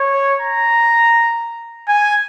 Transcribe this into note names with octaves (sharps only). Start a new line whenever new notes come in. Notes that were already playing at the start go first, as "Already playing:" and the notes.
Already playing: C#5
A#5
G#5